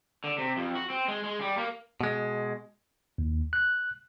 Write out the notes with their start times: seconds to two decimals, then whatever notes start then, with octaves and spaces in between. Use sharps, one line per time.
0.24 D3
0.38 C3
0.57 F2
0.75 F#4
0.90 C4
1.08 G#3
1.24 G#3
1.41 G3
1.57 A#3
2.01 B2 G#3
3.18 D#2
3.53 F#6